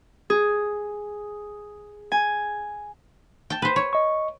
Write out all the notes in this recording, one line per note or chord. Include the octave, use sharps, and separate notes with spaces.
G#4
G#5
G5 A5
B4 C5
C#5
D#5 C#6